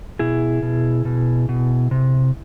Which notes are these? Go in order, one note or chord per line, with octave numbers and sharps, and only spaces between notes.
B2 E4 G#4
B2
B2
B2
C3